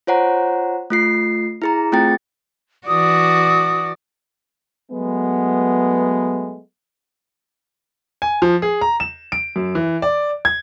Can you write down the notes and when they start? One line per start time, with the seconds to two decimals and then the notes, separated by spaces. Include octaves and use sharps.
0.07 F4 C5 C#5 F#5 A#5
0.90 A3 F4 C7
1.62 E4 G#4 A#5
1.92 A3 C4 F4 G#4 G5 A6
2.87 E3 F#4 D5 D#6
4.91 F#3 G#3 A3 B3
8.22 G#5
8.42 F3
8.62 G#4
8.81 A#5
9.00 E7
9.32 D7
9.56 F#2
9.75 E3
10.02 D5
10.45 G#6